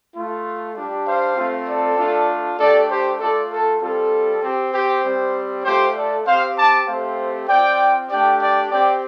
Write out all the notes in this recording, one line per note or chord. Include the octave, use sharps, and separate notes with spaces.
A3 F4
G3 D4 G4
C5 F5
A3 C4 F4
A4 D5
A3 D4 F4
A3 D4 G4 A4 D5
G4 C5
A3 F4 A4 D5
A4
G3 C4 F4 A4
C4 G4
G4 C5
G3 C4 G4
A3 F4 G4 C5
A4 D5
C4 G4 C5 F5
A5 D6
A3 C4 G4 C5 F5
C4 F4 D5 G5
A3 D4 G4 D5 G5
D5 G5
C4 G4 D5 G5